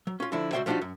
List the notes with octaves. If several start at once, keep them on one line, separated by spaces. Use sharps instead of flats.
F#3
C#4 F4
D3 F3 E4 D5
C#2 F#4 C5 D5 E5 G5
F3 G3 D4 D#4 F4 F#4
F#2